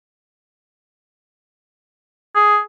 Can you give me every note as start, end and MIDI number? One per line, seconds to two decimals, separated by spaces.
2.35 2.59 68